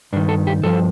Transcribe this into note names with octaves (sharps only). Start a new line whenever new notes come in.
G2 D#3 D4
A4
G4
G2 F3 A4